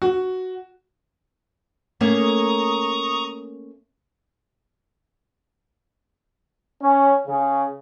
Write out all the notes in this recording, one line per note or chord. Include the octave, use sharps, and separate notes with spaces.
F#4
A3 A#3 C#4 A#5 C#6 D#6
C#4
C#3